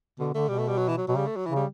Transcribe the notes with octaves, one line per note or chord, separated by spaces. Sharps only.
B2 D3
D3 A3
B2 G3
A3
G3
F#3
E3
F#3
B2 F#3
C#3 G3
A3
F#3
C#3 E3
G3